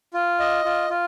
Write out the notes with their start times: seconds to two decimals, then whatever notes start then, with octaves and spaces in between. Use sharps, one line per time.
0.14 F4
0.40 D#5
0.65 F4
0.90 F4